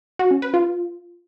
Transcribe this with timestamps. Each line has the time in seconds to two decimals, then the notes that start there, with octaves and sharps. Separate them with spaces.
0.19 F#4
0.31 C#4
0.42 B4
0.54 F4